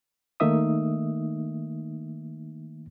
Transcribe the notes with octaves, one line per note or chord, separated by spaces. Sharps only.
D#3 A3 A#3 D#4 E5 D#6